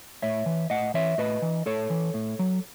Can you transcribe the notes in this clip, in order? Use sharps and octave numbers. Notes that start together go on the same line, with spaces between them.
A2 C#5 E5
E3
A2 D#5 F#5
E3 C#5 E5
A2 B4 D#5
E3
A2 A4 C#5
E3
A2
F#3